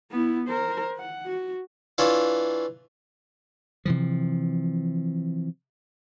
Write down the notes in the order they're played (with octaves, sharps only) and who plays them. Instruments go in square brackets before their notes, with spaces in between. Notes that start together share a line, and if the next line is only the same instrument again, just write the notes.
[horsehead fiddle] B3 E4
A#4 C5
F#5
F#4
[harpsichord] E3 D4 F4 C#5
[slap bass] C3 E3 F3